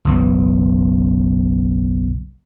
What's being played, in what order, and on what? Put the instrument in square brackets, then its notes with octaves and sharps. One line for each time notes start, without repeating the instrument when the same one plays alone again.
[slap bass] F#1 B1 E3